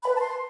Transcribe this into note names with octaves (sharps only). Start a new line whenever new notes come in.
B5
B4
A5
C6